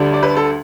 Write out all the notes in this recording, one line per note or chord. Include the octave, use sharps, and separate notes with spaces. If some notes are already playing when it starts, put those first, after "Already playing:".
Already playing: D2 D3 G3 D4
D5
B4
A4